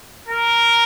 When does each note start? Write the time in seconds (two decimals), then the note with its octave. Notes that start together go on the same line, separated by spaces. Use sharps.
0.28 A#4